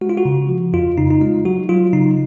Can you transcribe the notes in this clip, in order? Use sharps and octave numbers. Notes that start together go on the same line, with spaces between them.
G#3 F#4
F4
F#4
C#3
F3
F2 F4
C#3 D#4
D#4
G#3 F4
F#3 F#4
F#3 F4
C#3 D#4